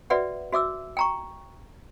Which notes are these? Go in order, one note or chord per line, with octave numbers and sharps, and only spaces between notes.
F#4 B4 D5 E5 F#5
F#4 E5 D6 E6
G5 A#5 C#6